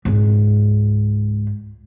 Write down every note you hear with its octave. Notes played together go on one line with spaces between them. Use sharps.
C#2 G#2